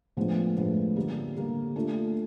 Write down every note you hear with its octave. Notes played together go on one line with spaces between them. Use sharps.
A2 F3 G#3 B3 D4
A2 F3 G#3 B3 D4
D3 G3 A#3
D3 G3 A#3
A3 D4 F4 A4